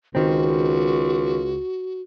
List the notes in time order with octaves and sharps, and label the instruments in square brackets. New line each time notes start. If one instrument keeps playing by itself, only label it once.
[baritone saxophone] C#2 [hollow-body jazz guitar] D#3 C4 [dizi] F#4